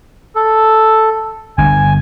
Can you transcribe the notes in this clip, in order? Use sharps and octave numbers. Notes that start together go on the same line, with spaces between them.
A4
G1 G2 G#5